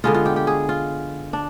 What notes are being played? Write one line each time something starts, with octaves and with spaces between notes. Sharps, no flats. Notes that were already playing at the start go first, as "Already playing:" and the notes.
D3 G#3 B3 F4
F4
G4
G4
G#4
F4
D4